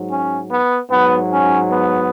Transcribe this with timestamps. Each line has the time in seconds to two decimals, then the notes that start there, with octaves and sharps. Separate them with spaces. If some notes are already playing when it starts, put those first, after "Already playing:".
Already playing: G#2 F#3
0.10 C#4
0.51 B3
0.90 G#2 F#3 B3
1.31 C#4
1.71 B3